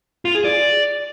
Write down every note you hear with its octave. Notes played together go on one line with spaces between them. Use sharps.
F4
G#4
D5